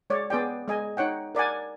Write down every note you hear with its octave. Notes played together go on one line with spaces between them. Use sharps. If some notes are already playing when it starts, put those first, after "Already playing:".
G#3 C#5 D5
B3 G#4 D5 G5
G#3 D#5 G#5
D#4 C#5 F#5 G5
A#4 D5 F#5 G#5